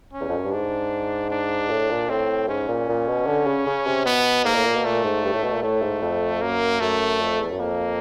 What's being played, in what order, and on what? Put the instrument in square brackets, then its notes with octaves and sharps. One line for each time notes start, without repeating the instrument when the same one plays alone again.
[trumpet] C#4
[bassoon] E2
F2
F#2
G2
[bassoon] G#2 [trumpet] D4
[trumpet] D4
[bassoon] A2
A#2
[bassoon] A2 [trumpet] C4
[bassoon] G#2 [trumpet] C#4
[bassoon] A#2
A#2
B2
D3
C#3
C#3
C3
[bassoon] B2 [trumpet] B3
[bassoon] G#2 [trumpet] A#3
[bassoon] A2
A#2
B2
[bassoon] A#2 [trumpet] A3
[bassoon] G#2
G2
A2
B2
A#2
[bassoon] A2 [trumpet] A3
[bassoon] G#2
F2
[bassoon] F#2 [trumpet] A#3
[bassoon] F#2 [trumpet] A3
[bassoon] F2
E2
F#2
[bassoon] F2 [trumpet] A#3